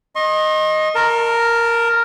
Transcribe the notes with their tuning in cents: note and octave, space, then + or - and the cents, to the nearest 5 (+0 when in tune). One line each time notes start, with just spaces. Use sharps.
D#5 +0 C6 +45
A#4 +0 A5 +25